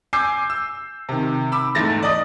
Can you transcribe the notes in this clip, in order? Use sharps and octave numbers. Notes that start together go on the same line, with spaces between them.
G#5 D6 E6 G6 C7
E6
C3 D#3
B5 D6 E6
E2 G#2 A3 A6 A#6
D5 D#5 D#6